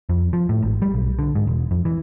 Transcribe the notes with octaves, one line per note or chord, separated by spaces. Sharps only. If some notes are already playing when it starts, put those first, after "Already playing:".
F2
F3
A2
G#1
G3
B1
D3
G#2
E1
F2
E3